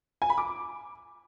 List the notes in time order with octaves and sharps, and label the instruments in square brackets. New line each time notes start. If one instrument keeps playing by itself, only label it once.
[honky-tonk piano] G#5
B5
D6